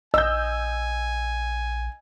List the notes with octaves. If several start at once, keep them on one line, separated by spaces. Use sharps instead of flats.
A#1 D#5 G#5 E6 G6